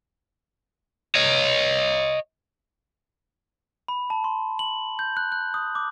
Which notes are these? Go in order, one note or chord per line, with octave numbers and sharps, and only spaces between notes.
C#5 D#5
B5
A5
C6
F#7
G6
F#6
F#6
D#6
D6